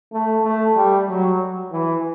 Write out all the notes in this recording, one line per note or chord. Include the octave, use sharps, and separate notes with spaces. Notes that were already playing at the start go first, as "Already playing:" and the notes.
A3
A3
G3
F#3
E3